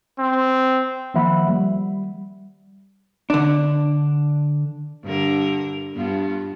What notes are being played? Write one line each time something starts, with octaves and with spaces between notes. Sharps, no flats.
C4
D#3 F3 A#3 E5 F#5 B5
G3
D3 D4
G2 D3 A#4
G2 B3 F4